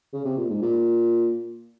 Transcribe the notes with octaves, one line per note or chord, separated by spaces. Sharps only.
C#3
C3
A#2
G#2
A#2